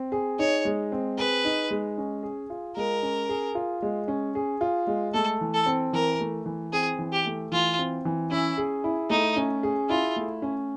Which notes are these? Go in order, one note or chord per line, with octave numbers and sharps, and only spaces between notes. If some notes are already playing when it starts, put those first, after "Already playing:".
Already playing: C4
G#4
D#4 C#5
G#3
C4
G#4 B4
D#4
G#3
C#4
G#4
F4
G#3 A#4
C#4
G#4
F4
G#3
C#4
G#4
F4
G#3
A3 A4
E3
A4
C4
E3 A#4
A3
E3
C4 G#4
E3
G4
A3
E3 F4
C4
E3
C#4 E4
G#4
E4
A3 D#4
C#4
G#4
E4 F4
A3
C#4